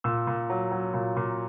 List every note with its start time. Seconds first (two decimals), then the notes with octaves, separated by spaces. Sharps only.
0.04 A#2 E6
0.27 A#2
0.50 F#3
0.72 F#3
0.94 A#2
1.17 A#2